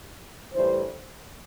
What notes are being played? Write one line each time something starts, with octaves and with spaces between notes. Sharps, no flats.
A2 E3 G3 D4 C5